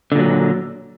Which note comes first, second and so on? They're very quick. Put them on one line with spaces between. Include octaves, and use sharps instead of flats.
D3 A#2 F#3